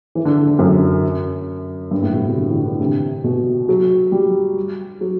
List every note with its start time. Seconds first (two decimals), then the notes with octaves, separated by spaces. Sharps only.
0.15 E3
0.25 D3
0.47 D3
0.59 F#2
1.91 G2
2.02 A2
2.13 B2
2.25 C3
2.36 D3
2.50 E3
2.66 D3
2.80 C3
3.24 B2
3.69 F#3
4.12 G3
5.01 F#3